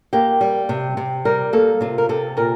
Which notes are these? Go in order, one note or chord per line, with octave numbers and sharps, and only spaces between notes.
A#3 G4
G3
C3
C3
G3 A#4
A#3 A4
C3 F4
A#4
C3 A4
A#2 A#4